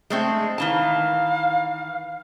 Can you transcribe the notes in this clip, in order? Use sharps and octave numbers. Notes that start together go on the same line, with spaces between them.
G#3 A3 C4
D#3 E3 F5 A5